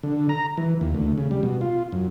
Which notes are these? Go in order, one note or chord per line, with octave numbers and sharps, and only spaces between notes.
D3
A#5
E3
D#2
D2
C#3
G3
B2
F4
F#2